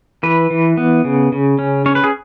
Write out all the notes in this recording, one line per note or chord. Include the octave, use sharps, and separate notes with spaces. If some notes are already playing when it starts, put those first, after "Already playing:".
E3 B4
E3
B3
C#3
C#3
C#4
C#4 C#5
B4
G#4